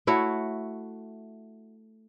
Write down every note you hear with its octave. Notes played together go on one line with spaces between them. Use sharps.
A3 E4 F#4 C#5